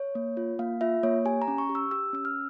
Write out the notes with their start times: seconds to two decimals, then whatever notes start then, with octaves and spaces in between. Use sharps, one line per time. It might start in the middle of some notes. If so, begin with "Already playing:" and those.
Already playing: C#5
0.15 A#3
0.37 F4
0.59 A#3 F5
0.81 F4 E5
1.03 A#3 C#5
1.25 G4 G#5
1.42 A#5
1.48 C#4
1.58 C#6
1.69 G4
1.75 E6
1.91 G4 E6
2.13 C#4 E6
2.25 F6